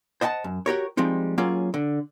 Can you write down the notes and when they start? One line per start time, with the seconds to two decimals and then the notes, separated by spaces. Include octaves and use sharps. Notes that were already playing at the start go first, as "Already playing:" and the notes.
0.21 C5 D#5 F#5 G#5 A5
0.44 F#2
0.66 F#4 G4 A#4 C#5
0.97 F3 G3 G#3 C4 D#4
1.38 F#3 A#3 C#4 F4 G#4
1.74 D3